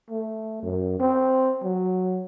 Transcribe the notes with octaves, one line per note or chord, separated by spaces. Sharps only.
A3
F#2
C4
F#3